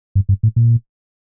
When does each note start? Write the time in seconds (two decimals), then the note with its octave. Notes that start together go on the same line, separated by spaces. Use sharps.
0.15 G2
0.29 G2
0.43 A2
0.56 A#2